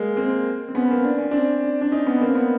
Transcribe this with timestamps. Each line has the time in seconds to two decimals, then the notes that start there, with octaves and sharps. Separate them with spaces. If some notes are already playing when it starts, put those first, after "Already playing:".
Already playing: G#3 A#3
0.17 A#3 C4
0.69 C4
0.75 B3 C#4
0.91 A#3 C4
1.04 D4
1.18 C#4
1.31 C4 D4
1.81 D4
1.92 C#4 D#4
2.07 B3 C#4
2.21 A#3 C4
2.35 B3